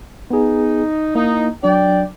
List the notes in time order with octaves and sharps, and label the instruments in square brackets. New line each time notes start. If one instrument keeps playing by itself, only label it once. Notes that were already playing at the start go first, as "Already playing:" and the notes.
[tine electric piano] B3 G#4 [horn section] D#4
[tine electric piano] A#3 E4 [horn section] D#4
[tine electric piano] F#3 D4 [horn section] D5 G5